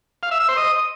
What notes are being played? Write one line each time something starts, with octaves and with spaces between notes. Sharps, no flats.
F5
E5
E6
C5
D#5